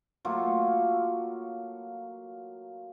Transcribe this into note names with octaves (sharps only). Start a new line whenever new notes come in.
F#3 A3 A#3 F4